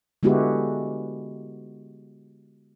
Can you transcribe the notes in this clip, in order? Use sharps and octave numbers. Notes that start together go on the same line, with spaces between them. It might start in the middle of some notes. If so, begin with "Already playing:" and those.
D3 G#3 B3 E4 F#4 G4